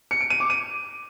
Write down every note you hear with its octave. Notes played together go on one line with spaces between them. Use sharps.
C#7
D7
D#7
D6
D#7